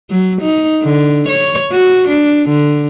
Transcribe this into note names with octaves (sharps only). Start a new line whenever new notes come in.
F#3
D#4
D3
C#5
F#4
D4
D3